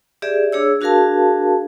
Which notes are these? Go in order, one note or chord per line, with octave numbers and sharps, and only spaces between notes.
G4 G#4 D5 E5
D4 G#4 C#5 E6
D4 F#4 G#4 A#4 F5 A5